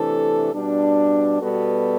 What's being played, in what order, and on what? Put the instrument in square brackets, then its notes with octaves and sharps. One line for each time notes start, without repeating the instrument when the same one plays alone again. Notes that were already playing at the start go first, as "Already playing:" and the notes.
Already playing: [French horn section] C3 E3 A3 D4 A4
B2 G3 D4
B2 G3 B3 F#4 A4